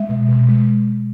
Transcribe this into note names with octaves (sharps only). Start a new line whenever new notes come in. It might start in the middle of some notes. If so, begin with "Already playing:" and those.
Already playing: G#3 E5
B2
B2
G#3